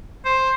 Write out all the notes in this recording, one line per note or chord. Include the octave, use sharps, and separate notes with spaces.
C5